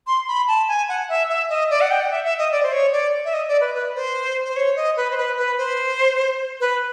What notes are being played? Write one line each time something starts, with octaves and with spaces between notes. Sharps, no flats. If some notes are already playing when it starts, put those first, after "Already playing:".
C6
B5
A5
G#5
F#5
E5
E5
D#5
D5
F#5
G5
F#5
E5
E5
D#5
D5
C5
C#5
D5
E5
D#5
D5
B4
B4
C5
C5
C#5
D#5
B4
C5
B4
B4
C5
B4